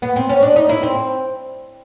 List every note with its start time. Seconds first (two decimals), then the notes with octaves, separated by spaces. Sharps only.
0.02 B3
0.16 C4
0.29 C#4
0.42 D4
0.56 D#4
0.69 E4
0.83 C4